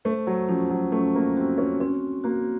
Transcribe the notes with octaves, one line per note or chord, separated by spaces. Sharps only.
A3 C5
F#3
F3 C#4
F#3
A3 C#4
A#3
C4 F#4
C#4
C4 C#4
A#3 F#4